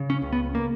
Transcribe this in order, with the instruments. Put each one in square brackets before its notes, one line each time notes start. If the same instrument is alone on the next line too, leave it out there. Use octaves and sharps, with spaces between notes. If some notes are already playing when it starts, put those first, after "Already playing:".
Already playing: [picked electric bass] C#3
C#4
C#2
B3
A#3